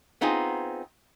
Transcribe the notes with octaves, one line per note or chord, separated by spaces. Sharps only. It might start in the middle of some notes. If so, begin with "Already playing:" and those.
B3 C4 D#4 F4 G#4